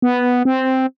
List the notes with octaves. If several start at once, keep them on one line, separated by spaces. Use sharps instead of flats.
B3
C4